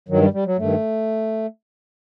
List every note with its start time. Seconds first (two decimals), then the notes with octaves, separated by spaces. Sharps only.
0.09 G2 D#3 F#3
0.21 G3
0.33 G3
0.46 F#3
0.58 G2 D#3 A3